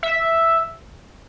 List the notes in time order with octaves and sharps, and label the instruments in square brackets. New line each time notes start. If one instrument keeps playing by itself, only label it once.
[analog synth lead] E5